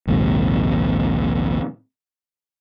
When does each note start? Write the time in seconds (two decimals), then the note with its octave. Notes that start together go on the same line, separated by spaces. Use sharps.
0.07 A#1 D#2 G#2 C3